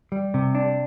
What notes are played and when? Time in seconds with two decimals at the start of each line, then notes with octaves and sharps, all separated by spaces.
0.12 G3
0.34 C3
0.55 D4